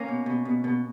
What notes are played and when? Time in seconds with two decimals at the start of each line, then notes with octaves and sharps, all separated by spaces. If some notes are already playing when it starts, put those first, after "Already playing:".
Already playing: A#3 C#4
0.08 B2
0.26 B2
0.45 B2
0.64 B2